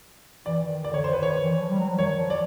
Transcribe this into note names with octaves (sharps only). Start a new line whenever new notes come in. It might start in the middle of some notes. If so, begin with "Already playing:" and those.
E3 D5
D#3
D3 D5
C#5
C5
B4
D#3 C#5
E3
F3
G3
F#3
F3
D#3 C#5
F3
D5